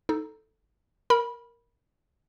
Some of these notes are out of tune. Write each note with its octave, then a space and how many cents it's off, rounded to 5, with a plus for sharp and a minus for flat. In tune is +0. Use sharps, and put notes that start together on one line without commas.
D#4 +5 A4 +0
A#4 +0 B5 -20